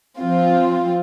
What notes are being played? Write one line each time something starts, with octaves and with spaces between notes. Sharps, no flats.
F3 C4 F4